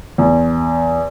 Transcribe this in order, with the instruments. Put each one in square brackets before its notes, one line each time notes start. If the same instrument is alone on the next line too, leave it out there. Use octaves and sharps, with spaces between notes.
[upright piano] E2